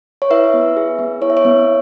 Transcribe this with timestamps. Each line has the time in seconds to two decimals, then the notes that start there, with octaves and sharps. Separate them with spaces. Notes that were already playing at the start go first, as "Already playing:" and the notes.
0.22 C#5
0.30 E4 B4 E5
0.54 B3
0.77 G#4
0.99 B3
1.21 E4 C#5
1.30 E5
1.37 C#5
1.45 B3